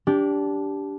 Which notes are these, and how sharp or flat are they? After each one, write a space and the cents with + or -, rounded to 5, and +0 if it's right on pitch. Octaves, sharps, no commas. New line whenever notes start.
D4 -20 G4 +0